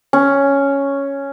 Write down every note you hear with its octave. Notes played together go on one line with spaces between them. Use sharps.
C#4